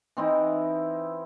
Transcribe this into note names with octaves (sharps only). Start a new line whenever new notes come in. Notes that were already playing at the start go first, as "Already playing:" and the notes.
E3 C4 D#4 E4